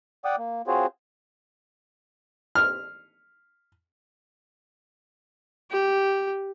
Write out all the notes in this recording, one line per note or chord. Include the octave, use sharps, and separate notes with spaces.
D5 F#5 G5 D6 D#6
A#3
C4 F4 F#4 G#4 C5 C#5
F6
G4